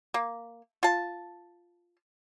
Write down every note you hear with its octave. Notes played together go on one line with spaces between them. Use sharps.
A#3
F4 A5